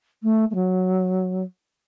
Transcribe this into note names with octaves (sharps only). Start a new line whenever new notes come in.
A3
A3
F#3